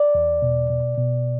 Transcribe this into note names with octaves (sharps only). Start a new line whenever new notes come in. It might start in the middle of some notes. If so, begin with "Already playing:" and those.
Already playing: D5
E2
B2
B2
B2